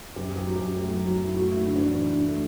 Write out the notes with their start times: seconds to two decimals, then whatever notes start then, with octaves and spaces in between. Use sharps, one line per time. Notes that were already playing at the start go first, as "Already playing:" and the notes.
0.16 F#2 G4
0.31 F#2 G4
0.47 F#3
0.56 G4
0.61 F#2
0.76 A3 G4
0.91 F#3
1.06 F#3
1.21 F#2 E4
1.36 A3 F#4
1.51 A3 E4
1.66 D3
1.76 D4
1.81 E2
1.91 D4
1.96 E2 E4
2.12 D3
2.26 A3